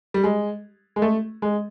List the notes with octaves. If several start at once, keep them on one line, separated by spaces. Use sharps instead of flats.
G3
G#3
G#3
A3
G#3